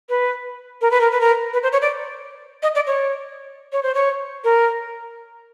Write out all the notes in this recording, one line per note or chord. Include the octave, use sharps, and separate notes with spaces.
B4
A#4
B4
A#4
B4
A#4
B4
C5
C#5
D5
D#5
D5
C#5
C#5
C5
C#5
A#4